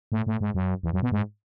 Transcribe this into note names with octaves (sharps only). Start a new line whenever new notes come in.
A2
A2
G#2
F#2
E2
F#2
B2
G#2